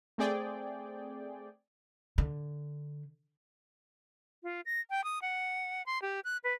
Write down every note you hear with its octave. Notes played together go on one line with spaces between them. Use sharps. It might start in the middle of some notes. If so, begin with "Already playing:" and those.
A3 C4 G#4 D5 G5
D3
F4
A#6
G5
D#6
F#5
C6
G4
F#6
B4